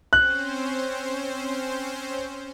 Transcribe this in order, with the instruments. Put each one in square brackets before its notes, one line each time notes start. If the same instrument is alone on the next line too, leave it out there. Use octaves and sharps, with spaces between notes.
[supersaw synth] C4 C#4 C5 [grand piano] F#6